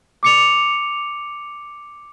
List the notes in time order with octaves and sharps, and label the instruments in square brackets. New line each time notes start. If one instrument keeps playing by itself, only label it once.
[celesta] D6 C#7 F7